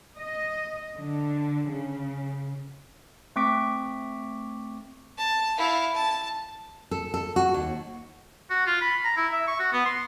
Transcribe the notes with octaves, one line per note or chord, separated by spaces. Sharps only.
D#5
D3
C#3
A3 C4 C#6 D6 B6 D7
A5
E4 F5
A5
A4
A4
F#4
D#2
F#4
F4
B5
A#5
E4
E5
C#6
F#4
B3
C6